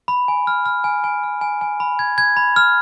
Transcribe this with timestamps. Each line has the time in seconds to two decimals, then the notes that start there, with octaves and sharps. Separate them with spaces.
0.08 B5
0.28 G#5
0.47 F6
0.66 F6
0.84 G#5
1.04 G#5
1.23 F6
1.41 G#5
1.61 G#5
1.80 B5
1.99 G#6
2.18 G#6
2.37 B5
2.56 F6